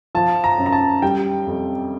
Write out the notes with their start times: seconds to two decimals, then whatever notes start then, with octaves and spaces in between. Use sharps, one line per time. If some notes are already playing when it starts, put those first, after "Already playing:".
0.15 F3 A5
0.44 A#5
0.58 F#2
0.66 A#5
0.72 A5
1.02 G3 G5
1.47 F2